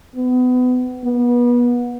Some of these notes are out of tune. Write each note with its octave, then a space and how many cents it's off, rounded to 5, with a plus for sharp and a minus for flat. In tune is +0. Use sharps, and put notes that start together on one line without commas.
B3 +30
B3 -30